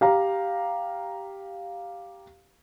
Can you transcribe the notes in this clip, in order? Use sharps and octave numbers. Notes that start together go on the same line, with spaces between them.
G4 F5 A#5